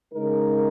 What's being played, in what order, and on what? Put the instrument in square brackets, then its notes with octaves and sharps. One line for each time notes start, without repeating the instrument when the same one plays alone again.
[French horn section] C#3 G#3 D#4 A#4